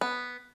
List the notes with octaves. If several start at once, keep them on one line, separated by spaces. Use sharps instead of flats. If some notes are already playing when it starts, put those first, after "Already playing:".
B3